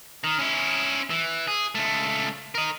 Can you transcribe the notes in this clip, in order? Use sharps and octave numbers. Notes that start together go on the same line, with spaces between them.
D#3
C#4 E4
E3
G#4
C#2 A3
A#4 D#5